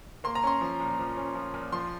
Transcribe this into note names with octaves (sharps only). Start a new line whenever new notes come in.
A#3 C6
A#5
C#4 C6
F3
A#2
F3
C#4
F3
A#2
F3 C6